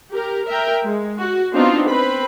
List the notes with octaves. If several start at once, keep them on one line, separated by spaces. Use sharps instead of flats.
G4 A#4
A#4 E5 G5
G#3
F#4
B3 C4 D4 D#4 F4
C4 B4 B5